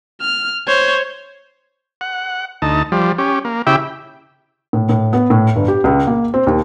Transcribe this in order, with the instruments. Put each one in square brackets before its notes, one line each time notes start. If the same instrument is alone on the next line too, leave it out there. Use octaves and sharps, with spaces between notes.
[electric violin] F6
C5 C#5
[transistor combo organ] F#5
D2 D#4 A5
F3 G3
C#4 G4
A#3
C#3 E4 G4 E5 G5
[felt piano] A2
A2
B3
A2
G1
G4
C#2
A#3
C4
D#2